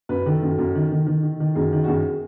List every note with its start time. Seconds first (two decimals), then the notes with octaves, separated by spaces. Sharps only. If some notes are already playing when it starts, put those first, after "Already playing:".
0.09 F#2 B4
0.26 D#3 A4
0.43 F#2
0.58 F#2
0.75 D#3
0.91 D#3
1.07 D#3
1.23 D#3
1.40 D#3
1.55 F#2 G#4
1.73 D#3
1.84 F#4
1.88 F#2 G#4